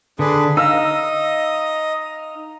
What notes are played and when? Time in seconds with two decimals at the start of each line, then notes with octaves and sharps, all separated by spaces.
0.19 D3 D4 G#4 B4
0.57 D#4 D#5 F5 E6 F6